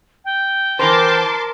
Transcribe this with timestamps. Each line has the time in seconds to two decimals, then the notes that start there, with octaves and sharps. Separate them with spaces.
0.25 G5
0.79 E3 A#4 C5 A5 C6 D6